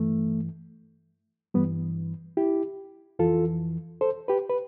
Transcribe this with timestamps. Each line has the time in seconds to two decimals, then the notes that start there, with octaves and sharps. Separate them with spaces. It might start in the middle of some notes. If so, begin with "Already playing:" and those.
Already playing: G2 E3 A3
1.54 G2 E3 G3 B3
2.37 E4 G4
3.19 F2 E3 F4 A4
4.01 A4 C5
4.28 G4 B4
4.49 B4